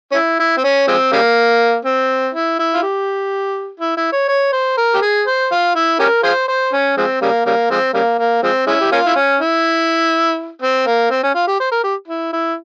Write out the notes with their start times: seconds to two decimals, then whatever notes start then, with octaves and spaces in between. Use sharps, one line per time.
0.12 C#4
0.15 E4
0.40 E4
0.58 C4
0.64 C#4
0.88 F3 G#3 C4
1.13 C#3 G3 A#3
1.85 C4
2.35 E4
2.59 E4
2.74 F4
2.83 G4
3.80 E4
3.97 E4
4.12 C#5
4.29 C#5
4.53 C5
4.77 A#4
4.94 G4
5.02 G#4
5.27 C5
5.51 F4
5.76 E4
6.00 C#4 G4 A#4
6.24 F4 G#4 C5
6.48 C5
6.73 C#4
6.98 F3 G#3 C4
7.22 C#3 G3 A#3
7.46 C#3 G3 A#3
7.71 F3 G#3 C4
7.94 C#3 G3 A#3
8.19 A#3
8.43 F3 G#3 C4
8.67 G#3 C#4 E4
8.81 G4
8.92 A#3 C#4 F4
9.06 E4
9.16 C#4
9.40 E4
10.62 C4
10.87 A#3
11.11 C4
11.23 C#4
11.35 F4
11.48 G4
11.60 C5
11.71 A#4
11.84 G4
12.08 E4
12.33 E4